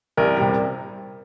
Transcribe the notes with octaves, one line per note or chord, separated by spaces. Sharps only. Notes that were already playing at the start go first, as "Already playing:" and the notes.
C2 A#4
C3 G3